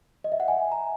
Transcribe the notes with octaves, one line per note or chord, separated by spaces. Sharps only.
D#5
E5
F#5
G#5
A#5